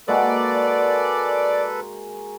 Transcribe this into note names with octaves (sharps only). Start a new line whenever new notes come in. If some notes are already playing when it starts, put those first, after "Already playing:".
G#3 A#3 F#4 A4 B4 D5